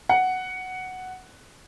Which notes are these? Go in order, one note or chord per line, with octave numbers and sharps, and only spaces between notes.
F#5